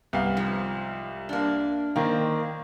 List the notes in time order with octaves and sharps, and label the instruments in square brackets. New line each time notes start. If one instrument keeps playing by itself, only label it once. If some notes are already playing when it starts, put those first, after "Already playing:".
[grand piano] C2 F5 [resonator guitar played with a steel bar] B3
[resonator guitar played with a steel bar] G#2 F3
A#3 D4
[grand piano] D#3 A#3 [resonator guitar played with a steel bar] C4